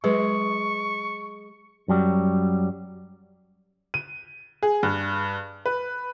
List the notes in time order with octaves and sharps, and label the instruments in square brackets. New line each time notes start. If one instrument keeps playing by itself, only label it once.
[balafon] F#3 B4 [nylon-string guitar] G#3 [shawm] C#6
[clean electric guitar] F#2 F#3 G3
[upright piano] D#7
G#4
G2
B4